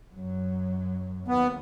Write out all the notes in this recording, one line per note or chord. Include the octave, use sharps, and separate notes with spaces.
F#2 F#3
D#2 B3